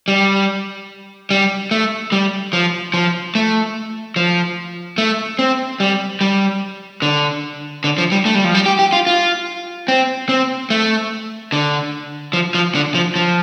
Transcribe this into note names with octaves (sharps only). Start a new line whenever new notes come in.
G3
G3
A3
G3
F3
F3
A3
F3
A3
C4
G3
G3
D3
D3
F3
G3
A3
G3
F3
G3
G4
G4
F4
F4
C4
C4
A3
D3
F3
F3
D3
F3
F3